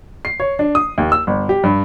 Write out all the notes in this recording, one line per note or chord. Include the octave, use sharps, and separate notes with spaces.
C7
C#5
D4
D#6
D#2
E6
G1
G4
G2